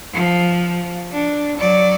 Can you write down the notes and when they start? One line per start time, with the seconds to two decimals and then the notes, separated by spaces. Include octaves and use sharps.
0.13 F3
1.12 D4
1.58 F#3 D5